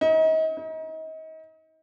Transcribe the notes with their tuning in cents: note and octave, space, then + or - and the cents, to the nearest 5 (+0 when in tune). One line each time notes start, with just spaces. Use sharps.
D#4 +35
D#4 +35